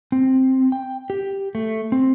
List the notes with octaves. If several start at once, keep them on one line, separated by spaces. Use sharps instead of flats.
C4
G5
G4
A3
C4